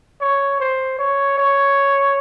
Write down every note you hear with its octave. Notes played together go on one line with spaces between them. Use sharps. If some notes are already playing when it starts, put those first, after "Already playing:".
C#5
C5
C#5
C#5